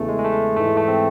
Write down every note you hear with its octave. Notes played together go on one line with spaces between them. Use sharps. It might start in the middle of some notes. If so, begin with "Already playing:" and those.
Already playing: E2 C#3 E3 A3
G#3
G#3
A3
G#2 E3 A3
G#3
A3
C4